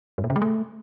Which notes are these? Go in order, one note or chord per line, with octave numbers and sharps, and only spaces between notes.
G2
A#2
C#3
G#3
A3